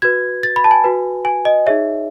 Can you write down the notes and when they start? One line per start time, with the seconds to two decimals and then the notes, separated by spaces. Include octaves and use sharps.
0.02 F#4 B4 G#6
0.43 A6
0.56 B5
0.64 A5
0.71 G#5
0.84 F#4 B4
1.25 G#5
1.45 D#5
1.66 D#4 G#4 C#5 E5